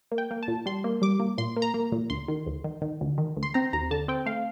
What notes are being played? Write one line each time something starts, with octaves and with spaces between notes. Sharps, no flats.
A#3
G5
A#3
A5
A#2
G3 C6
A#3
G3 D6
A#3
A#2 C6
A#3
A#5
A#3
A#2
D2 C6
D#3
D2
D#3
D#3
D2
D#3
D2
C6
C4 A#5
D#2 A#5
D3 A5
C4 G5
A3 F5